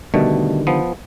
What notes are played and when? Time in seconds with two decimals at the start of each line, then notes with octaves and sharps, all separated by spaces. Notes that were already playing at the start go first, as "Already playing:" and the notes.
0.14 B2 D3 D#3 G3 A3
0.67 F3 B3